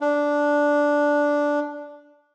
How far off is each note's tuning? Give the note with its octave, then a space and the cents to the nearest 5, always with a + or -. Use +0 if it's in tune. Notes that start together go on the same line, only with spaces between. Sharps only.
D4 -5